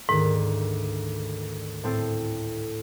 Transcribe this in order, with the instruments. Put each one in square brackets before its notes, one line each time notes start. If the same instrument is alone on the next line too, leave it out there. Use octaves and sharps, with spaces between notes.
[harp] D2 D#3 [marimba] G#2
[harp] A2 C4 A4